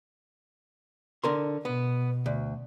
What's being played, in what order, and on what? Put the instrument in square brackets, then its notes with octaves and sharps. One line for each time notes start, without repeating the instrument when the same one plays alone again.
[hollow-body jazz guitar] D3 A#4 C6
[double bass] B2 [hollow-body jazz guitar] B3
[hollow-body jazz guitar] D2